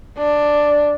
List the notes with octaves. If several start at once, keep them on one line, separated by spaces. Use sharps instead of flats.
D4